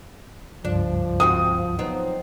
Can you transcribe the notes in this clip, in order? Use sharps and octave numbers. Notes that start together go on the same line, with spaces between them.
C#2 G2 F3 D4
G#2 C4 F#4 D#6
F3 F#3 B3 C4 D#4